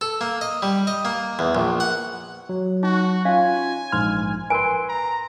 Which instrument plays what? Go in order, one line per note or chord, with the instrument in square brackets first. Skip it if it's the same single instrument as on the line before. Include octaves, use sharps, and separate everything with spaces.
[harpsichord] A4
A#3
D#5
G3
D#5
A#3
E2
A#1
F#5
[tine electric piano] F#3
[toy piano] D#4 [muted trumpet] F#4
[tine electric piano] C#4 F4 [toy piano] F5 [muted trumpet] G#5
[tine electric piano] A#1 G#2 F6 [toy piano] C6
[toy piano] A#4 G#5 [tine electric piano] B4 C6
[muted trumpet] A#5